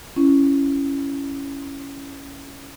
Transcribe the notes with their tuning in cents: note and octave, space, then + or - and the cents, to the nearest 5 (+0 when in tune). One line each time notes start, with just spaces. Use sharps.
C#4 +0 E4 +15